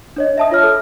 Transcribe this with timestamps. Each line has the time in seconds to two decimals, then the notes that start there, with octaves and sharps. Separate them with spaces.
0.16 D4 C#5 D#5
0.38 E5 A5 D#6
0.51 F4 C#5 F6
0.63 A4